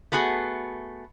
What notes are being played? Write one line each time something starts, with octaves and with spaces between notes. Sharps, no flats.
A3 B3 F#4 G#4